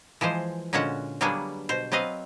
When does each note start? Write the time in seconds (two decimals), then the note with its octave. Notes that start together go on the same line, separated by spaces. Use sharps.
0.21 E3 F3 G#3 C5
0.73 A#2 D3 G#3 C#4 F#4 F#5
1.21 F#3 G3 A#3 B3 D4 G#4
1.69 B2 C5
1.92 F#3 C4 B4 D#5 F5